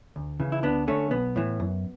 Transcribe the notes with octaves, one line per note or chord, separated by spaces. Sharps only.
D2
C#3 E3
E4
D2 B3 D4
D3 A3 C#4
B1 B3
A2 E3
F#2